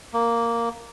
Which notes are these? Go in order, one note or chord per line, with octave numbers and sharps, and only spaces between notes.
A#3